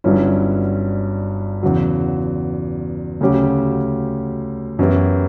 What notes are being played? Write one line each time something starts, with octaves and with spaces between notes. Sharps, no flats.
G1 G2 F#3 C#4 E4
E2 C#3 F#3
D2 C#3 F#3 C#4 G4
F#2 E3 B3 E4 G4